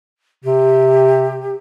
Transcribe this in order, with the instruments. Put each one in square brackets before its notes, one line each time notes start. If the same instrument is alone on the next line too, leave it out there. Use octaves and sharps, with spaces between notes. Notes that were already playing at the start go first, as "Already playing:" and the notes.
[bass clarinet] C3 [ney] G4